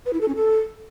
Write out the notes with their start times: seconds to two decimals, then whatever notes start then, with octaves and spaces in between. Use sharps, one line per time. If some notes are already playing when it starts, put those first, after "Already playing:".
0.06 B4
0.13 E4
0.21 A4
0.28 C#4
0.36 A4